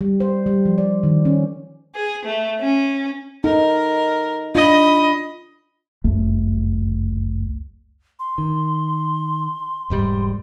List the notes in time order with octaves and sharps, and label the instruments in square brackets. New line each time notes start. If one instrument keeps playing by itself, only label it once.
[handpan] G3
C5
G3
F3
D5
D#3
C#4
[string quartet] G#4
A3
C#4
[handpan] D#4 A4 [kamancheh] A#4
[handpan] D4 F4 [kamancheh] D#5 B5
[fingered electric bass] G1 C#2 F#2 A3
[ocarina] C6
[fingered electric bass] D#3
E1 G#2 G3